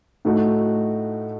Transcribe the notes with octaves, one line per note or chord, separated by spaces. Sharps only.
A2 A3 D#4 F#4